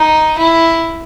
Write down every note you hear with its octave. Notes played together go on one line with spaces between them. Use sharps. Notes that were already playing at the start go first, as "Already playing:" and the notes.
Already playing: D#4
E4